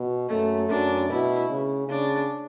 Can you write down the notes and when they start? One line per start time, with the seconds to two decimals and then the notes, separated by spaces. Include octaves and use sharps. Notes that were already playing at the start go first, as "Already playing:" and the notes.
Already playing: B2
0.29 F#2 A3
0.69 F#2 D4
1.09 B2 E4
1.49 C#3
1.89 C#3 D4